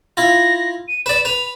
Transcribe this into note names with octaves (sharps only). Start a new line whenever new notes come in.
E4 F4 A#6
D#7
B4 D5 E7
B4 F7